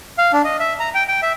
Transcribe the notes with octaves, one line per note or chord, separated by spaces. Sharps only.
F5
D4
D#5
E5
A#5
G5
G5
E5